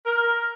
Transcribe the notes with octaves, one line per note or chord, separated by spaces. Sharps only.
A#4